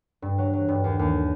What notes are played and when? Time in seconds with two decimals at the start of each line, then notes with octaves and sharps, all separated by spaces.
0.22 G2
0.38 F#3
0.53 F#3
0.68 G2
0.84 D#2
0.99 D#2